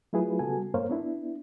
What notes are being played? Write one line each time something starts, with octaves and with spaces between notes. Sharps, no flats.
F#3 A3 E4 F4 G#4 B4
C#3 G3 B3 F#4 A4 G#5
G2 A#3 A#4 C5 C#5 F5
B3 D4 E4